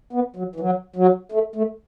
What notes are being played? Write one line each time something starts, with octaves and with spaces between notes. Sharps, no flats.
B3
F#3
E3
F#3
F#3
A3
A3